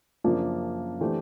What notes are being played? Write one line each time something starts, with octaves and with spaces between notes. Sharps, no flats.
F#2 C#3 F3 A#3 D4
E3 A3 D4 G4 C5